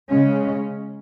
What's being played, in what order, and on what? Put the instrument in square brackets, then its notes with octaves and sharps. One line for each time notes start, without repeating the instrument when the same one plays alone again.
[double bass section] C#3 G#3 C#4